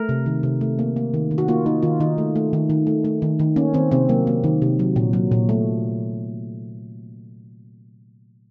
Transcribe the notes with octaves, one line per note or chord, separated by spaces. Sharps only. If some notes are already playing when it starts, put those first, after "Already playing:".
Already playing: A3 A#4
C3
D#3
C3
A3
A#3
A#3
D#3
D#3
F#4
A#3 F4
A#3 D#4
D#3 F4
D#3 D#4
A3
A3
D#3
D#3
A3
A3
D#3
D#3
A#3 C#4
D#3 C4
C3 C4
F#3 A#3
A#3
D#3
C3
F#3
A#2
F#3
A#2
A3